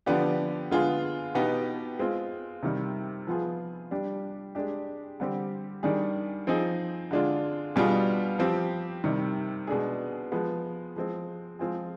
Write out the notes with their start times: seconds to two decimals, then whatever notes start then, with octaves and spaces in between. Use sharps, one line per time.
0.06 D3 F3 B3 D4 G4
0.71 D3 G#3 B3 F4 G#4
1.35 B2 B3 D#4 G4
1.99 G#3 C4 F4
2.63 C3 D#3 G3
3.27 F3 B3 F4 G#4
3.91 G3 D4 G4
4.55 G#3 D4 G4
5.20 D3 G3 C4 G4
5.83 D#3 G3 D4 G#4
6.47 F3 C4 D#4 G#4
7.11 D3 G#3 D4 F4
7.76 B2 G3 D4 F4 G#4
8.39 F3 C4 G4
9.04 C3 D#3 G3
9.67 B2 G#3 D4 G#4
10.32 F3 G#3 B3
10.96 F3 G#3 C4
11.59 F3 G#3 C4 F4 G#4